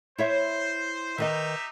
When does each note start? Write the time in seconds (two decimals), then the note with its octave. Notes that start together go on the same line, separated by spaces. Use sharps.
0.18 E4 C5 C#5 E5
1.18 D#3 D#4 G4 B4 D#5 E5